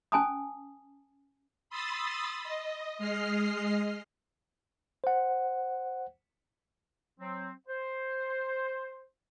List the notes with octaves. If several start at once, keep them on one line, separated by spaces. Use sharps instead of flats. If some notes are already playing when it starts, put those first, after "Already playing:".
C#4 G#5 A5 D#6
B5 C6 D#6 E6 A6
D#5
G#3 D#5 F6 C7
C5 F#5
F#3 C4
C5